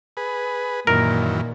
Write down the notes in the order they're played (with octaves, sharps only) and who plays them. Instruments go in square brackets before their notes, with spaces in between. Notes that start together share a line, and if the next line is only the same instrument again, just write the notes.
[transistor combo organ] G#4 B4
[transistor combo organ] F#2 D#3 E3 [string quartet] A#2 [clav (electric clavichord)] A#4